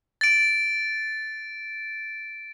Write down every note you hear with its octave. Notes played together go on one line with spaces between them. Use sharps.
A6 D7